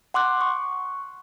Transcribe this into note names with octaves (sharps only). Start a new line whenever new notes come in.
F#5 C6 D6 F#6
C#6